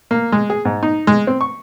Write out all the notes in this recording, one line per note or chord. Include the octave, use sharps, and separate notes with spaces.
A#3
G#3
G#4
G#2
D#4
G#3
C4
C#6